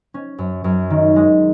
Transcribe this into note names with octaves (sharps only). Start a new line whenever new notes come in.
C#4
F#2
F#2
D#3
G#3